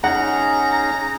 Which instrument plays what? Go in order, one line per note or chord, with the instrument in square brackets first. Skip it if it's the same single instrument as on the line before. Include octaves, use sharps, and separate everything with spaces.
[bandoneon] C#4 D#4 G#4 [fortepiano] F#5 [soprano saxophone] A#5